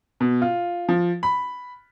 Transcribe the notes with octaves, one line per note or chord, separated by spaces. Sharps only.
B2
F4
F3
B5